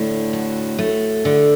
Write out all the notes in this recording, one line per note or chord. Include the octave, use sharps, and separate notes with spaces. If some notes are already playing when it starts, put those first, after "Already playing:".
Already playing: A2 D3
F#4
A3
D3